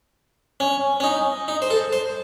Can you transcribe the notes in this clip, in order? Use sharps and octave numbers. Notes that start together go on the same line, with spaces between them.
C#4
C#4
D#4
D#4
C5
A4
C5